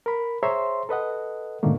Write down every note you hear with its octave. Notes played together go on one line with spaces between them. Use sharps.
A#4 B5
G#4 C5 C#5 E5 A#5 C6
A4 B4 D#5 F#5
G#2 B2 D3 D#3 A3 A#3